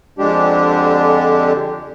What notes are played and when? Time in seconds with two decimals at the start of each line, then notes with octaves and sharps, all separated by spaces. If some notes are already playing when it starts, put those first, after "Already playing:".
0.19 F2 D3 G#3 D4 G4